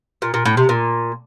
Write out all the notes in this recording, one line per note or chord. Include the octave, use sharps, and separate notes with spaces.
A#2
A#2
A2
C3
A#2